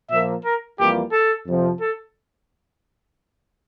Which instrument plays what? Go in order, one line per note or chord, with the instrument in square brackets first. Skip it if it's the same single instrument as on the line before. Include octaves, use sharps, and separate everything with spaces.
[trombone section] A#2 F3 A#3 [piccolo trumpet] E5
[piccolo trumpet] A#4
[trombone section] F2 E3 G3 A#3 F4 [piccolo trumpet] G4
[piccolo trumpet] A4
[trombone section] F2 C3 F3
[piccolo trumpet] A4